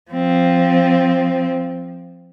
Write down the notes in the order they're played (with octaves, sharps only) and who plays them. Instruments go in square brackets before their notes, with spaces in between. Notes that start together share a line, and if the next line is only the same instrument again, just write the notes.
[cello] F3 C4